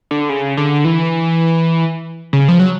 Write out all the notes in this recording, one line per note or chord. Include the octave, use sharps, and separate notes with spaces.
D3
C#3
D3
E3
C#3
F3
F#3